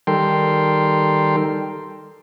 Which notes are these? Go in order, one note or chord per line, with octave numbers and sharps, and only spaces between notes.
D#3 G3 A4 A#4 G5 C6